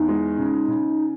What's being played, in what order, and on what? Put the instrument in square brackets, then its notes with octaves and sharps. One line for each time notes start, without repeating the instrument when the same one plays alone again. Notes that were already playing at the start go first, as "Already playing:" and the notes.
Already playing: [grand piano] E2 [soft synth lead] D#4
[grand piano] G#3
C#3
C#3